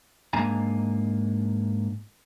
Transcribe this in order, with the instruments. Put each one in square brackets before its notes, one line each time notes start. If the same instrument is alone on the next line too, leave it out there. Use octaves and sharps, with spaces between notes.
[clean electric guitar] G#2 A#3 D4 G#5 A#5